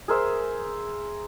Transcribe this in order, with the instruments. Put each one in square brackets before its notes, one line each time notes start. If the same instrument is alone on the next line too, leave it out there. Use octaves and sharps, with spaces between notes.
[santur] G#4 A#4 C5 E5